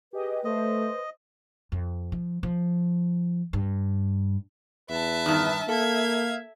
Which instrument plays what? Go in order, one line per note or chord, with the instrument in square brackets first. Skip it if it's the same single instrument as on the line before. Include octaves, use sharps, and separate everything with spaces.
[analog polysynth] G4 G#4 D#5 [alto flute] B4
[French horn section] A3 [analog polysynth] C5 [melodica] D#5
[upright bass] F2
F3
F3
G2
[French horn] E2 [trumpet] B4 [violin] E5 A5
[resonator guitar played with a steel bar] G2 D#3
[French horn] A#3 [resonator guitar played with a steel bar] A4 [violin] E5 G#6 [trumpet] F5